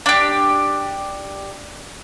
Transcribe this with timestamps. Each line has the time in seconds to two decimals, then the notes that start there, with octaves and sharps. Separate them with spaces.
0.06 D4 G4